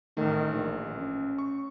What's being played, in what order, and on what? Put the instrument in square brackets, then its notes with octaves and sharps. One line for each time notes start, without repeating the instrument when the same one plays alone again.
[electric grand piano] A1 A3 [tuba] D#3
[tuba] A#1
C#4
[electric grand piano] C#6